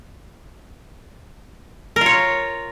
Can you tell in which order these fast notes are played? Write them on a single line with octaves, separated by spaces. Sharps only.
A#4 F4 C#5